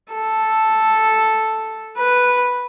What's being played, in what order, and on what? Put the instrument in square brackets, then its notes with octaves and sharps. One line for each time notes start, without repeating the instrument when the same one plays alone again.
[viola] A4
B4